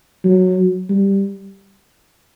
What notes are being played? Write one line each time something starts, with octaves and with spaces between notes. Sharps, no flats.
F#3
G3